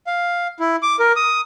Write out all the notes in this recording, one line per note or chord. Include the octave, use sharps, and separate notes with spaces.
F5
E4
D6
A#4
D#6